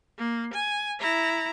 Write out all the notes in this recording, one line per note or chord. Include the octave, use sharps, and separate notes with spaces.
A#3
G#5
E4 A#5